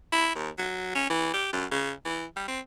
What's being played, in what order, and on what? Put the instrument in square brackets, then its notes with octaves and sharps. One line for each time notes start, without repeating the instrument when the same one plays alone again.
[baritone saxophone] E4
D#2
F#3
C#4
E3
G4
F#2
C#3
E3
G3
C4